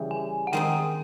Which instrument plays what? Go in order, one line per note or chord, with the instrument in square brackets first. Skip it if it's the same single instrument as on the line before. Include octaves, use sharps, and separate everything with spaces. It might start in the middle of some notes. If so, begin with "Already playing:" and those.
Already playing: [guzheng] C#3 E3 G3
[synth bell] G#5
F#5
[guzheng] D#3 G#3 C4 D#4 [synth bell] G5